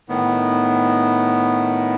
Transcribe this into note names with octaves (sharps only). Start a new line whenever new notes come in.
A2 D#3 B3